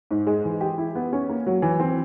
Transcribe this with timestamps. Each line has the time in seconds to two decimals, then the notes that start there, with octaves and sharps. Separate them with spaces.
0.11 G#2
0.27 G#3
0.44 E3
0.61 G4
0.78 E4
0.95 B3
1.13 C#4
1.29 A#3
1.47 F#3
1.62 E3
1.80 C4